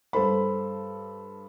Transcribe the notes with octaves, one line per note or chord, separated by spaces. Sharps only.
G2 A4 C5 B5